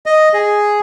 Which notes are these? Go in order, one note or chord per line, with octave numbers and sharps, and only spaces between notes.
D#5
G#4